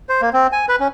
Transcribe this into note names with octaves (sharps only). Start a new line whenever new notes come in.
C5
A#3
C4
G#5
B4
C#4